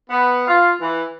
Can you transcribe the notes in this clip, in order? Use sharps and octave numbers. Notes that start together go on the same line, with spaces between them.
B3
F4
E3